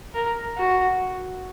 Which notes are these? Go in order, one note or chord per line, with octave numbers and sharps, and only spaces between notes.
A#4
F#4